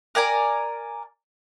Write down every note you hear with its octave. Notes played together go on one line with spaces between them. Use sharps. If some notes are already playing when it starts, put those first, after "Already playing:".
A#4 D5 G#5 A#5